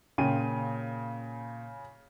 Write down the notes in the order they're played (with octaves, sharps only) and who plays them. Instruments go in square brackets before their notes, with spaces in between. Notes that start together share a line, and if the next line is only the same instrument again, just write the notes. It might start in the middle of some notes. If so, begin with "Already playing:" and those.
[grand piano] A#2 G5 D#7 [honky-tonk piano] C#3